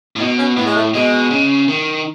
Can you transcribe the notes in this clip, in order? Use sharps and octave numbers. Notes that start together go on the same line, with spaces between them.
A2
B2 D#4
C#4
A2 B3
G#3
A3
B2 G#3
C#3
D#3